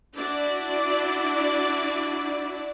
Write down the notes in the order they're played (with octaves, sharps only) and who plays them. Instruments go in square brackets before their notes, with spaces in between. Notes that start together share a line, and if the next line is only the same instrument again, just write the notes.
[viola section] D4 E4 F#4 D5